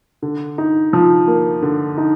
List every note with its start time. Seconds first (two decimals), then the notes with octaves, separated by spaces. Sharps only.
0.22 D3
0.58 D#4
0.93 F3
1.28 A#3
1.62 D3
1.98 D#4